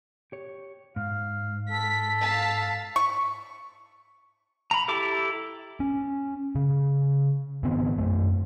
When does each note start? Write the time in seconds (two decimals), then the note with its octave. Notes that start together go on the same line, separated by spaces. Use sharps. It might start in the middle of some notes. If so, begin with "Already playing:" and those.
0.32 G4 C#5
0.96 G#2 F5
1.71 A4 B6
2.19 F5 A5 B6
2.96 C#6
4.71 A#5 B5
4.88 E4 G4 A4 E5 D6
5.80 C#4
6.55 C#3
7.63 G#2 D#3 B3 C4
7.98 F#2 A3